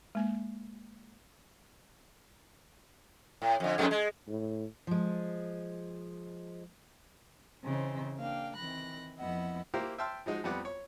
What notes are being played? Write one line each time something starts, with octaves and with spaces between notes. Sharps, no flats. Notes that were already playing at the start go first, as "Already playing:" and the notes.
G#3 A#3
A2
F2 D3
F2 G#2 A3
G#3
A2
F3 G#3
C#3 E3 C4 D#4 C5
A#3 D4 F5 G5
D#3 E3 C4 B5 F#6 A#6
F2 F3 B3 E4 D#5 F#5
A#3 E4 G4 C5 F5 A#5
E5 G5 A5 C6 E6 F6
F3 G#3 D#4 F#4
F2 G3 B3 F#5 D6
C#5